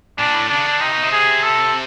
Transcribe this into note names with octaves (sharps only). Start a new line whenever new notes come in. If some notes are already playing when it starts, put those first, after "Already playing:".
A#2 D4
A2
C#3 D4
D3
C3 D#4
B2
C3
G#4
A4